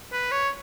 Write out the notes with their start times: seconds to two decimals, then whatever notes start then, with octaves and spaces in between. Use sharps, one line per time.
0.13 B4
0.32 C#5